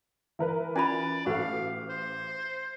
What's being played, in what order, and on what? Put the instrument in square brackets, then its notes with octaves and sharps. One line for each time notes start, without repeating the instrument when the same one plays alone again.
[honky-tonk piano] E3 A#4 B4
[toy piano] C#4 F4 B5 [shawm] D5 [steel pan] G#5
[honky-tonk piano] A1 [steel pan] F#4 A4 [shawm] F5
[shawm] C5